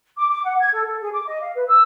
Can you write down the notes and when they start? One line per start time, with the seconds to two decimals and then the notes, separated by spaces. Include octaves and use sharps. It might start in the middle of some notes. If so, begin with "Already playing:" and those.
0.16 D6
0.28 D6
0.43 F#5
0.60 G#6
0.72 A4
0.85 A4
1.00 G#4
1.12 D6
1.26 D#5
1.41 F5
1.55 B4
1.68 E6